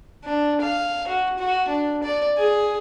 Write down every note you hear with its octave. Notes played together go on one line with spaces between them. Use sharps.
D4
F5
F#4
F#4
D4
D5
G#4